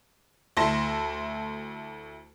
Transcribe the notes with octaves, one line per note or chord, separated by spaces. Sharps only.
D2 E4 A5 C6 A#6